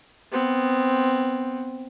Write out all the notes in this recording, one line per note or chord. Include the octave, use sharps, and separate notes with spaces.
B3 C4